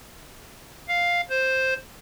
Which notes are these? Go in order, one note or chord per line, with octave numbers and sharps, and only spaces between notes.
F5
C5